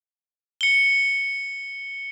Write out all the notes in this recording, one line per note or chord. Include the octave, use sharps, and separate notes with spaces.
C#7 G7